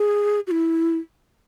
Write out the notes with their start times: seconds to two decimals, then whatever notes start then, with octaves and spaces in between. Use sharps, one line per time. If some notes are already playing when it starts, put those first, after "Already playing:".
Already playing: G#4
0.47 F#4
0.51 E4